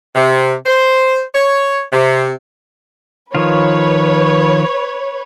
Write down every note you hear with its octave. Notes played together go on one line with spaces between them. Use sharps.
C3
C5
C#5
C3
D#3 F3 F4 B4 C#5